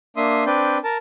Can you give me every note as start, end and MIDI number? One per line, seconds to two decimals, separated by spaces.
0.17 0.44 58
0.17 0.44 62
0.17 0.44 76
0.17 0.44 84
0.17 0.44 87
0.46 0.78 60
0.46 0.78 62
0.46 0.78 71
0.46 0.78 74
0.46 0.78 91
0.84 0.97 70
0.84 0.97 81